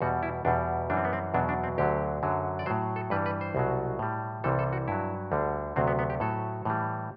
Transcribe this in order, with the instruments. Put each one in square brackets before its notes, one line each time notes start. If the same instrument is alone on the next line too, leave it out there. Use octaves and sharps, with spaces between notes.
[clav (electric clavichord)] E2 B2 G3 F#4
E4
E2 B2 G3 D4
F#2 E3 G3 D4
C4
B3
C4
E2 B2 F#3 D4
D4
C4
D2 D3 F#3 G4
F#2 D3 F#3
D5
A2 F#3 C5
A4
G2 E3 G3 B4
B4
C5
C2 B2 F#3
A2 G3
C2 C3 E3 G3 A4
A4
F#4
G2 F#3 E4
D2 D3 G3
D2 C3 F#3 C4
B3
B3
G4
A2 F#3 A4
A2 E3 G3